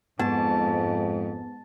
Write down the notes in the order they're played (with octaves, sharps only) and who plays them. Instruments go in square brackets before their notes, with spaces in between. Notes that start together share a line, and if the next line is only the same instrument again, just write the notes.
[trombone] F2 [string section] G#2 [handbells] B3 [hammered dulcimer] A5